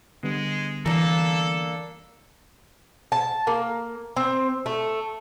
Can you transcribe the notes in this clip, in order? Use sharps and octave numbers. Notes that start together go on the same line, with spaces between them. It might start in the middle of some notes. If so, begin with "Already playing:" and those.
D3 G3 G#3 B3
E3 A#3 D4 A4
A5
A#3
C4
A3